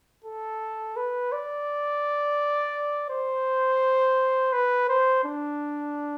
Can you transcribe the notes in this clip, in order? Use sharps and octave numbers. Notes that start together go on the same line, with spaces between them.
A4
B4
D5
C5
B4
C5
D4